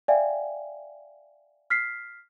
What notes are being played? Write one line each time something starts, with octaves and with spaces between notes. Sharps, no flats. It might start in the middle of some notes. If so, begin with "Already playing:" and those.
D5 E5 F5 G5 G#5
F6 B6 C7